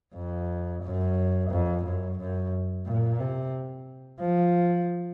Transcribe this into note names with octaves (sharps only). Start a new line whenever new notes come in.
F2
F#2
F2
F#2
F#2
A#2
C3
F3